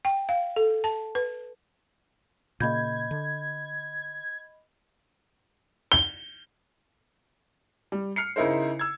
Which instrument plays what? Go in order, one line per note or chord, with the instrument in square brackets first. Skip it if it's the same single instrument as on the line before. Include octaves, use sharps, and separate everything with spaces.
[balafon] G5
F5
A4
A5
B4
[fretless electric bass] A#2 C#3 A#3 [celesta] D#5 B5 G6 [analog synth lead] G#6
[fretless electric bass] D3
[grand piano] G7
[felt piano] G3
F6 C7 C#7
C#3 D#4 E4 A#4 C5
E6 G#6